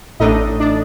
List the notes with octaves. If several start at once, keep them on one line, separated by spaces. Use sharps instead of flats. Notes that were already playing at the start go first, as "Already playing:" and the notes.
A1 A2 A3 D4 D#4 D#5
D4 D5